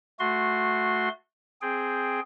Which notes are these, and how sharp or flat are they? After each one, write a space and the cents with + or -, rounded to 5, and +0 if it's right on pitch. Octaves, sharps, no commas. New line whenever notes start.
A3 -5 F#4 -15 C6 +0
C4 +0 G#4 +0 G5 +0